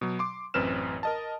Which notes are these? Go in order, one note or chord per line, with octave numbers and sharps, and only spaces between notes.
B2 F#3
C6 D6
A1 F#2 C4 B4 F6 E7
A#4 D#5 A5